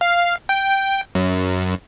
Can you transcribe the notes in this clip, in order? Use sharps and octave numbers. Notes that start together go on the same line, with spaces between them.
F5
G5
F#2